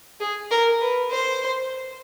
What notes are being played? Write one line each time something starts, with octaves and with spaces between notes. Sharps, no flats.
G#4
A#4
B4
C5